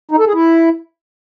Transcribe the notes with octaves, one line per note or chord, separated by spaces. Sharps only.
D#4
A4
G#4
E4